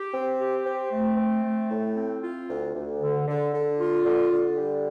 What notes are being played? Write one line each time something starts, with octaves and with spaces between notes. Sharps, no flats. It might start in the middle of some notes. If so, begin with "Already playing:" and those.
Already playing: G4
C4
G4
C4
A3
C4
A3
A2
C4
F4
D2
D2
D3
D3
D3
F4
D3
D3
G3